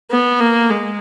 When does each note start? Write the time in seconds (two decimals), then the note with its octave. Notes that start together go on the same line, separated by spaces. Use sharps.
0.11 B3
0.40 A#3
0.70 G#3